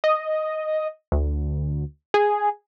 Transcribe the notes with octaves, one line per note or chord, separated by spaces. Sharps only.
D#5
D2
G#4